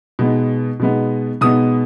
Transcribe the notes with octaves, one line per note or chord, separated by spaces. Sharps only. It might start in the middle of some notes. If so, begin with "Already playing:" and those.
B2 G#3 B3 D#4
B2 G#3 B3 D#4
B2 G#3 B3 D#4 D#6